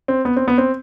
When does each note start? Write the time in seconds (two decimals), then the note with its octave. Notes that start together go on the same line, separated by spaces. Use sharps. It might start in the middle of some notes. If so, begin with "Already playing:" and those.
0.08 C4
0.25 B3
0.37 C4
0.48 B3
0.58 C4